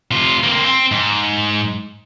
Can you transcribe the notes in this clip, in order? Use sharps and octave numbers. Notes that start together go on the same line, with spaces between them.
C3 F4
A#3 C4
C4
G#2